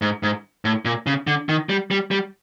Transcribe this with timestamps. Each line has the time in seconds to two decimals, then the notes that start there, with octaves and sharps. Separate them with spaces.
0.02 G#2
0.23 G#2
0.65 A2
0.85 A#2
1.07 C#3
1.27 D3
1.49 D#3
1.69 G3
1.91 G3
2.11 G3